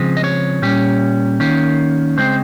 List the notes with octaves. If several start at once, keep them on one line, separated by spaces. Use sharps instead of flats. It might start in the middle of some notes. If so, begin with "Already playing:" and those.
Already playing: C#3 F3 G#3 C4
D#5
C#5
A#2 G3 C#4
D#3 A#3 C#4
C#3 G#3 C4 C5